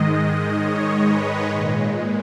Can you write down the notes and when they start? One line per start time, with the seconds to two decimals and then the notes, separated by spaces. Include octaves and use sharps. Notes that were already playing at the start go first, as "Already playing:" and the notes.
Already playing: G#2 D#3 G#3 D#5
0.54 C#5
1.02 B4
1.49 A#2 G#3